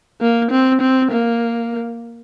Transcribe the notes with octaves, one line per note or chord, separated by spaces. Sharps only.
A#3
C4
C4
A#3